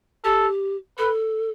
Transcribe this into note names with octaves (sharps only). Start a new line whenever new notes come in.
G4 A4
A4 B4